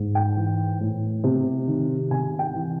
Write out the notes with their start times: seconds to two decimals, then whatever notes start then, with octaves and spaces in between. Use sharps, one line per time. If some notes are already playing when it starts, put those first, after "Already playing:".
Already playing: G#2
0.15 G5
0.37 E3
0.81 A2
1.24 C3
1.67 D#3
2.10 C3 G#5
2.39 G5
2.54 E3